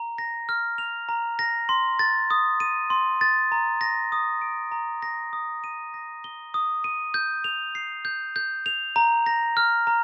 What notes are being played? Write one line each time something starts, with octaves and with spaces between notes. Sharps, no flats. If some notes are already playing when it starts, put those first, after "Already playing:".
Already playing: A#5
A#6
F6
F7
A#5
A#6
C6
A6
D#6
D#7
C6
A6
A#5
A#6
D#6
D7
A#5
A#6
D#6
D#7
A#6
G7
D#6
D#7
G6
F7
C7
G6
G6
F7
A#5
A#6
F6
A#5